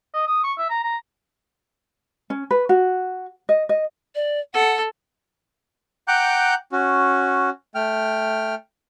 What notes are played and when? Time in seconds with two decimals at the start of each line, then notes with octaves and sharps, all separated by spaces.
0.14 D#5
0.27 D#6
0.44 C#6
0.58 E5
0.70 A#5
0.84 A#5
2.30 C#4
2.51 B4
2.69 F#4
3.49 D#5
3.69 D#5
4.15 D5
4.54 A4 F#5
6.08 F#5 G5 A#5 D6 F#6 G6
6.72 C#4 F#4
7.75 A3 G5 F6